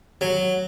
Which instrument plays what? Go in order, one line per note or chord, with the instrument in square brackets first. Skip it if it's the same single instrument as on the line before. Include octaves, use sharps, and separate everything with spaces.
[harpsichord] F#3